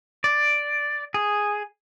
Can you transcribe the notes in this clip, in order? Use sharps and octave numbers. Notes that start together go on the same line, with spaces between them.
D5
G#4